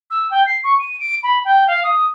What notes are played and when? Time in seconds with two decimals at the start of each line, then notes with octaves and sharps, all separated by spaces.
0.11 E6
0.31 G5
0.46 C7
0.64 C#6
0.79 D#7
1.00 D7
1.23 B5
1.45 G5
1.67 F5
1.84 D#6